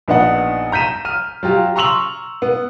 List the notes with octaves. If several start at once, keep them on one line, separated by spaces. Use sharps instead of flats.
A#1 B3 D4 D#4 F#5
A#5 G6 B6 D#7 E7
F6 D#7
F#3 F4 G4
A#5 C6 C#6 E6 F7 F#7
B3